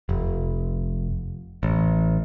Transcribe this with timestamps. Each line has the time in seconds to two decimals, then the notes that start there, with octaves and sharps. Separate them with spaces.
0.09 F1
1.63 A1